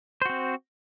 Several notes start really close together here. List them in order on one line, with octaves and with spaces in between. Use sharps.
C5 F#4 C4